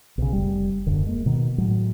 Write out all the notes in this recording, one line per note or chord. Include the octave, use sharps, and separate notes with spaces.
B1 C#3
F1 G3
D#1 F#2 D3
G#3 A#3
B2 D#3
A2 F#3 G#3